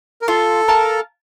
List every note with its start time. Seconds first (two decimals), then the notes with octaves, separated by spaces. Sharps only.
0.22 A#4
0.28 F4 A4
0.68 A#4 F5 A5